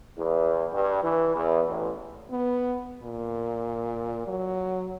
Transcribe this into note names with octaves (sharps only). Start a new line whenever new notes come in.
E2
G2
E3
E2
A1
B3
A#2
F#3